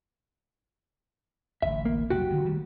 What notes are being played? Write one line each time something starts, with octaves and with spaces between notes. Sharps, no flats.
D1 A1 E5
A#3
F1 B1 G3 F#4 G4
D3 D#3 F#3
D#3 G3 A3